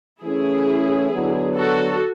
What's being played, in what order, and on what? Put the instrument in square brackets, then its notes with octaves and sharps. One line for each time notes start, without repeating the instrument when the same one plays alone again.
[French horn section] E3 A3 C#4 [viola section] E4 G#4
[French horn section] D3 F#3 B3
[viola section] F#4 A4